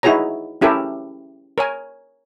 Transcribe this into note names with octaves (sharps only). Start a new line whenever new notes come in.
D#4 E4 F#4 G#4 C#5 A#5
C#4 E4 G4 A4 A#4
A#4 C#5 G#5